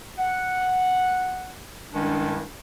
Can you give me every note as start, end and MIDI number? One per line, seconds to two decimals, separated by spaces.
0.18 1.58 78
1.93 2.43 36
1.93 2.43 43
1.93 2.43 51
1.93 2.43 56
1.93 2.43 61
1.93 2.43 62